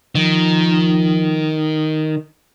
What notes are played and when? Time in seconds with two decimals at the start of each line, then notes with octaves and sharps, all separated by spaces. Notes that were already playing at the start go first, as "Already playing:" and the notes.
0.15 D#3 F3